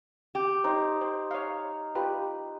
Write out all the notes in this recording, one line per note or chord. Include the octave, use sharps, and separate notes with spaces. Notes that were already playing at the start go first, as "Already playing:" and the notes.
G4
D#4 C5
C5
C#5 F5
F4 G4 B4